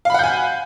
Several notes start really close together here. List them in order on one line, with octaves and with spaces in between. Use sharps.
F5 B5 F#5 G6 G#5